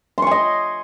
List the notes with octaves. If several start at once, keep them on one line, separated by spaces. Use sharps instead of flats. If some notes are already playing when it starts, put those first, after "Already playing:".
D#5 G#5 C6 C#6